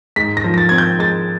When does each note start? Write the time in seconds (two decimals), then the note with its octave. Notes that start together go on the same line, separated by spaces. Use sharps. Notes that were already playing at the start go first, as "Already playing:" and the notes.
0.16 G#2 B6
0.37 A#6
0.44 F3
0.54 A#6
0.58 A6
0.69 C4 G#6
0.78 G6
0.99 G#3 A6